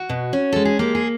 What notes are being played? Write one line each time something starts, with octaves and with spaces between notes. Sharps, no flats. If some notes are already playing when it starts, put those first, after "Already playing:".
Already playing: F#4
B2
C#4
G#3 A4
G#4
A#3 G4
G#4